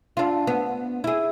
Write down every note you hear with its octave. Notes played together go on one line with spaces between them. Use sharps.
D4 F4
B3
E4 G#4